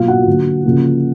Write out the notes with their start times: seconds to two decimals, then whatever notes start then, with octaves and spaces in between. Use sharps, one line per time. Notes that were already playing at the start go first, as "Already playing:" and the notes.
Already playing: B2 F#3 A#3 F4 F5
0.08 F#4 F#5
0.27 D3 F#3 A#3
0.64 C#3 F3 A#3